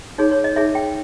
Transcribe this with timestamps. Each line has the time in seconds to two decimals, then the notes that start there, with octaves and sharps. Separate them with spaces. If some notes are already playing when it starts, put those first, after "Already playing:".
0.18 D#4 G#4 C#5
0.31 C#5
0.44 D#5
0.56 D#4 G#4 C#5 E5
0.75 G5